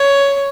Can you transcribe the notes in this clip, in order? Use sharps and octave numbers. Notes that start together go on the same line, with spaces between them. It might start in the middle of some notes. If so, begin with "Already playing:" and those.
Already playing: C#5